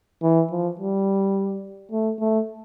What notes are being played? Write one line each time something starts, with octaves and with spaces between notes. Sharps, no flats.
E3
F3
G3
A3
A3